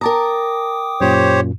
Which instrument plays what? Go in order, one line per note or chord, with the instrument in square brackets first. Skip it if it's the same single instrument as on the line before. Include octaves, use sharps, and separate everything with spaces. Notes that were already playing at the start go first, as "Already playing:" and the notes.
[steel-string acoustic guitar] A#4 A5 A#5 [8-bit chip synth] G5 D6 D#6
[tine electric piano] F#2 A#2 [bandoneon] G4 C5 C#5